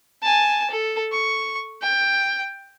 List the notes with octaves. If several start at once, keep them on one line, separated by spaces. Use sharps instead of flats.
G#5 A5
A4
C#6
G5